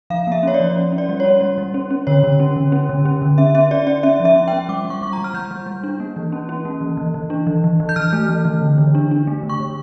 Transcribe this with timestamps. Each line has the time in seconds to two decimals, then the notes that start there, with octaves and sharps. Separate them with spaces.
0.10 F3 F5
0.27 A#3 E5
0.43 C#4 C#5
0.54 D5
0.60 F3
0.76 C#4
0.92 C#4
0.98 D5
1.09 G3
1.20 C#5
1.25 C#4
1.41 G3
1.58 G3
1.74 C#4
1.91 C#4
2.07 D3 C#5
2.23 D3
2.40 C#4
2.56 D3
2.72 C#4
2.89 D3
3.05 C#4
3.22 D3
3.38 C#4 E5
3.55 C#4 E5
3.71 C#4 D5
3.87 C#4 D5
4.03 C#4 E5
4.20 F3
4.25 E5
4.36 C#4
4.48 G5
4.53 C#4
4.69 G3 D6
4.85 G3
4.90 C#6
5.01 G3 C#6
5.13 A#5
5.18 G3
5.24 F6
5.34 G3 G6
5.51 G3
5.66 G3
5.84 D4
6.00 A#3
6.16 E3
6.32 C#4
6.49 C#4
6.65 A#3
6.81 E3
6.97 E3
7.14 E3
7.30 D4
7.47 E3
7.64 E3
7.80 E3
7.89 G6
7.96 E3 F6
8.13 A3
8.29 E3
8.45 E3
8.62 D3
8.78 D3
8.95 D4
9.11 D4
9.27 A3
9.43 D3
9.50 C#6
9.60 D3